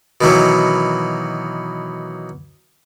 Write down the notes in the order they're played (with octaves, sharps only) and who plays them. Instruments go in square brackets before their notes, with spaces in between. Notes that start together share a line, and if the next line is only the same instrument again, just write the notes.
[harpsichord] B2 D#3 E3 F#3